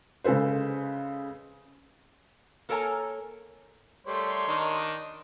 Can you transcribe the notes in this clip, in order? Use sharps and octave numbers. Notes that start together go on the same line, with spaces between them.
C#3 G#3 A4 B4 C5
A#3 A4 A#4 C#5 G#5 A#5
G3 A3 A#4 C#5 C6
D#3 D4 D#4